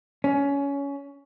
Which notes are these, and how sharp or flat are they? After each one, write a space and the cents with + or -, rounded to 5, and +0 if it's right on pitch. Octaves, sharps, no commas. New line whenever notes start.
C#4 +20